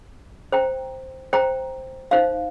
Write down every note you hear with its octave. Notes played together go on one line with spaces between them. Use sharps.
C5 G5 A#5
C5 G5 A#5
D#4 C5 F5